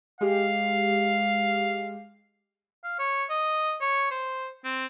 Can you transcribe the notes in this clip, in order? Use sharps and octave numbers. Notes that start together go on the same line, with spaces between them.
G#3 G4 F5
F5
C#5
D#5
C#5
C5
C4